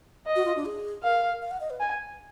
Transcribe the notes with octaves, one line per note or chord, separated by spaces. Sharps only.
D#5
F#4
F4
D4
G#4
A#4 F5
F5
F#5
D#5
B4
G#5